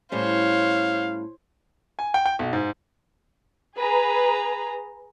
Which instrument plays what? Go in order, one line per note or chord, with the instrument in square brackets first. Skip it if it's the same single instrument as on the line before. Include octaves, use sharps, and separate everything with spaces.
[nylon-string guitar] A2 G3 C#4 [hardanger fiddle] C5 C#5 [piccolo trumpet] F5
[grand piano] G#5
G5
G5
B1
G#2
[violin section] G#4 B4 A#5